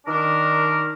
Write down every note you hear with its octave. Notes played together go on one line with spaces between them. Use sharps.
D#3 D4 A#4